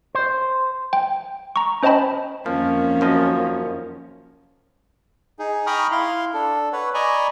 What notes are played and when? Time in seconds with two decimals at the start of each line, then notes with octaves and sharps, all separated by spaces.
0.15 C5
0.93 G5
1.56 A#5 C#6
1.83 C#4 C5 D#5 G5 A5 B5
2.46 F2 D#3 F3 A#3 C#4
3.01 F#2 F3 D#5
5.39 D#4 G#4
5.67 G5 A#5 B5 C#6 D#6 F6
5.91 E4 F5 C6
6.34 D4 A4
6.73 B4 C#5 F#5
6.94 D5 D#5 G#5 A#5 B5 C#6